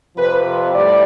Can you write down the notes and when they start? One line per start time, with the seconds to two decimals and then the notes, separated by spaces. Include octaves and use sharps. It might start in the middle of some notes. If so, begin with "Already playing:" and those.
0.16 F2 C3 F3 B4
0.74 A2 G3 D5